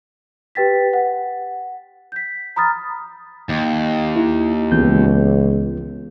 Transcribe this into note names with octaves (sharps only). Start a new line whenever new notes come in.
G4 B4 G5 A6 B6
F#5
G6 B6
A#5 B5 D#6 F6 A6
D#2
E4
C#2 E3 B3 G6